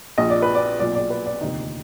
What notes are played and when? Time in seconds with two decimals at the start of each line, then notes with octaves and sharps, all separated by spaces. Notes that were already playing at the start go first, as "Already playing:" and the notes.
0.18 A#1 A#2 D#5
0.30 D5
0.42 B4
0.55 D5
0.79 B1 A#2 D5
0.95 D5
1.10 B4
1.26 D5
1.41 F1 D#2 D3 D#4